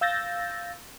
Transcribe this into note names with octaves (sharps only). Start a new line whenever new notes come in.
F5 E6 G6 A6 A#6